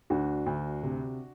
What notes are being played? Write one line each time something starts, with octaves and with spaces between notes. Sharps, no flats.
D2 D4 F#4
D2
C3